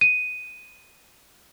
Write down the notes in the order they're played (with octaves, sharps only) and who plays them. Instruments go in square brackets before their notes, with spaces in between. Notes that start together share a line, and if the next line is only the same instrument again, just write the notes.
[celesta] D#7